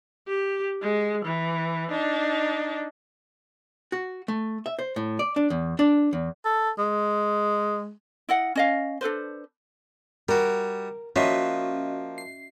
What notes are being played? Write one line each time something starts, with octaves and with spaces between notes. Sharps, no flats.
G4
G#3
E3
D4 D#4
F#4
A3
E5
C5
A2
D5
D4
E2
D4
E2
A4
G#3
E4 D#5 F#5
C#4 D#5 F5
D4 A4 B4 C5
G3 F#4 A#4
F3 A#3 C#4 F#4 D#5 E5
C7